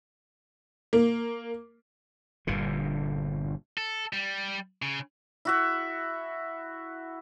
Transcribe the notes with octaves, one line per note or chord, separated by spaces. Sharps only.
A#3
G1 G2 A#2 D3
A4
G3
C#3
E4 F#4 E5